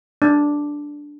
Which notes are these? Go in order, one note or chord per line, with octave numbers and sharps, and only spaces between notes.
D4